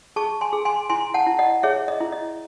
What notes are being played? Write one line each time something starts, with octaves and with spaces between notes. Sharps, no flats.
G#4 A5 C#6
G#5 C6
G#4
G#5 C6
E4 G#5 C6
F#5 A5
E4
D#5 F#5
G#4 C#5 E5
D#5
E4
D#5